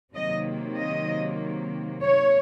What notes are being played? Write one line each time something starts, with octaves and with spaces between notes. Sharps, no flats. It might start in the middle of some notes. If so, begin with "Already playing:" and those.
C3 D#3 F#3 A#3 D#5
D#5
C#5